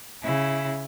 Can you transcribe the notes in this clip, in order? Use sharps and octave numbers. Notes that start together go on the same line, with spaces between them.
C#3 E4